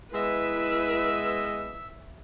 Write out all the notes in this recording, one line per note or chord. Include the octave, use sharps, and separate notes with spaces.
G#3 B3 E4 B4 D#5 E5 E6